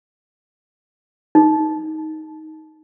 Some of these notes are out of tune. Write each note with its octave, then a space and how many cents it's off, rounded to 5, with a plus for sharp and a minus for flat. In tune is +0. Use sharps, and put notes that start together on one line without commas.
D#4 +10